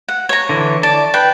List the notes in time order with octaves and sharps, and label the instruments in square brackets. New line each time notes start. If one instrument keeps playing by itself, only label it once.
[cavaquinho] F#5
C#5 A#5
[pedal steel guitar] D3 E3
[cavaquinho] D5 [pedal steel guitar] A5
[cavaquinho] B4 G5